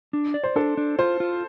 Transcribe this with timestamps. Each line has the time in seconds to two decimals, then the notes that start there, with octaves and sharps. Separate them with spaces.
0.13 D4
0.34 D5
0.44 C5
0.56 D4 A4
0.77 D4
0.99 F4 C5
1.20 F4